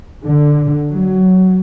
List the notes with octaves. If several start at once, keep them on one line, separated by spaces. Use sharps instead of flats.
D3
F#3